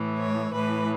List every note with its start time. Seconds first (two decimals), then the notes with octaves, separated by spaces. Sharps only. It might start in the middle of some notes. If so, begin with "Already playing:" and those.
Already playing: A2 E3
0.18 C#5
0.54 A2 E3 B4